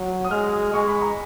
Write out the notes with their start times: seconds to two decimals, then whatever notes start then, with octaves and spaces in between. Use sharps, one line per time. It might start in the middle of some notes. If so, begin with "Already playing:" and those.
Already playing: F#3
0.25 D#6
0.31 G#3 F6
0.73 G#3 C#6
0.88 B5
1.02 A#5